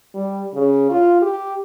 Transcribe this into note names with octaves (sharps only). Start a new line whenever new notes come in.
G3
C#3
F4
G4